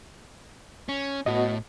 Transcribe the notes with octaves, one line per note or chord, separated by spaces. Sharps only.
C#4
A2 B3 F#4 D#5